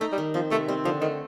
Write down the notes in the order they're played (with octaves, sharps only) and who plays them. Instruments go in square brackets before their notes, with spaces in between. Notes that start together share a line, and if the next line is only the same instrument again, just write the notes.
[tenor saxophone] A3 [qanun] D#4
[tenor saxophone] G3
[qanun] D#3
[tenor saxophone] F3 [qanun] C4
[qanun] C3 [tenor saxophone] A3
[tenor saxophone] G3 [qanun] C4
[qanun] D3 [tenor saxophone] F3
[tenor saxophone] D#3 [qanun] A3